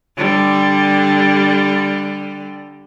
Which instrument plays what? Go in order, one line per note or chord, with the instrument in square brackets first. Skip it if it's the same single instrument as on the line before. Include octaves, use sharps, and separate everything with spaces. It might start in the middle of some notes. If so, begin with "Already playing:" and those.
[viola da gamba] D3 G3